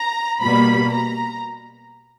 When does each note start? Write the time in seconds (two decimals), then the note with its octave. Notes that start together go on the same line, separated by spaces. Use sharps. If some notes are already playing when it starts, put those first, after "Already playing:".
Already playing: A#5
0.42 B2 G3 A#3 B5
0.92 A#5